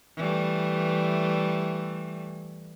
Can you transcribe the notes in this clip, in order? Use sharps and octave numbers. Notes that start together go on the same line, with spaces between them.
E3 G3 A3